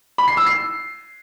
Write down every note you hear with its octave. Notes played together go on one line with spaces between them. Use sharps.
B5
C7
E6
C7